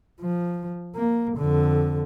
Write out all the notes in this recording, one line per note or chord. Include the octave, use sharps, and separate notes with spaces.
F3
A#3
F2 D3